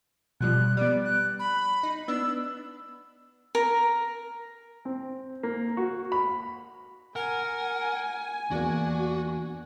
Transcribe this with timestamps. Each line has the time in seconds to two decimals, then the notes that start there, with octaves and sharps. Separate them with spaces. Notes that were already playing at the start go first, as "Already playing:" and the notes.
0.41 B2 F3 G3 F#6
0.77 G3 B3 D5
1.05 F#6
1.39 B5
1.83 D#4
2.08 B3 D4 E6
3.55 A#4
4.85 C4
5.43 A#3
5.77 F#4
6.12 B5
7.16 A#4 F#5 G#5 F6
8.51 E2 A#3 D4 F#4